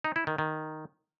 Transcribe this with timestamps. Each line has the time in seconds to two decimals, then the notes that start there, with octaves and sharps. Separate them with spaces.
0.04 D#4
0.16 E4
0.27 D#3
0.38 D#3